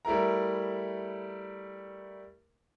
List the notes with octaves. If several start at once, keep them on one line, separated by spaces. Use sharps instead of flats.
G3 A3 E4 A#4 A#5